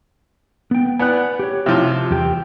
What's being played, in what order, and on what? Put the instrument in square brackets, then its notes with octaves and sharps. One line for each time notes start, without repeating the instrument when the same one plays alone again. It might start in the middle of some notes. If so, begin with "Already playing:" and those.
[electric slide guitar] B3 G5
[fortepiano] B3 F#6 [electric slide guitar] D5 F#5 G#5
[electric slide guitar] G4 C#5
[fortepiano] C3 F3
[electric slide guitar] E2 G4 G5